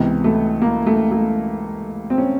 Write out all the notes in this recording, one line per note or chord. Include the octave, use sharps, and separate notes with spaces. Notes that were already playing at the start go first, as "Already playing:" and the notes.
Already playing: C#2 C3 E3 B3
A3
A#3
A3
A3
C4
C#4